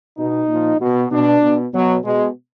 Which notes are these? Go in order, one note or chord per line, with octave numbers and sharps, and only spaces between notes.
B2 D#4
A#2 F3
B2
B2 D4
B2
B2 F#3
B2 G#3